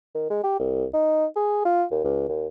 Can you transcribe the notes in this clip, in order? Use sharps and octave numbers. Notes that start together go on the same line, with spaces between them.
D#3
G#3
G4
C2
D#4
G#4
F4
D#2
C#2
D#2